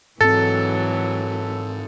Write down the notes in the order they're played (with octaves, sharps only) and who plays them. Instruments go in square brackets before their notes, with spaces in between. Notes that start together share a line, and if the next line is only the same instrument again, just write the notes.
[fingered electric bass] G#2 C4 [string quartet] E3 F#3 [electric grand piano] A4 [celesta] A6